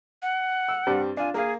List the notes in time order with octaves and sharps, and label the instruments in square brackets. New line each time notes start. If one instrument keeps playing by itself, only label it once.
[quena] F#5
[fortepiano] E6
G2 G3 C4
[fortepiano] D4 F4 [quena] G#5
[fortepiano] A#3 F5 [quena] G#4